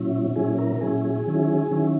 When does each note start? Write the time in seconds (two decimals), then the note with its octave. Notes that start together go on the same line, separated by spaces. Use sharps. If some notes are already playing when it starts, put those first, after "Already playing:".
Already playing: A#2 F#3 C#4 E4
0.36 A#2 F#3 C#4 E4 G#4
0.58 A#4
0.75 A#4
0.81 A#2 F#3 C#4 E4 G#4
1.04 G#4
1.27 D#3 F#3 C#4 E4
1.71 D#3 F#3 C#4 E4